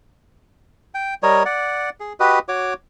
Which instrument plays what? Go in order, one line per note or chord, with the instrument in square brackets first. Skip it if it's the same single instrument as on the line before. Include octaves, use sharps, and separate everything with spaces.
[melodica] G5
G3 A#4 C#5 D#5
D5 F#5
G#4
F#4 G4 B4 D#5
F#4 C#5 D6